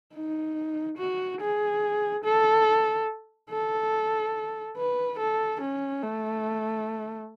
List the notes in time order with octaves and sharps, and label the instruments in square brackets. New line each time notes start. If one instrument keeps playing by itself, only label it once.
[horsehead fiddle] D#4
F#4
G#4
A4
A4
B4
A4
C#4
A3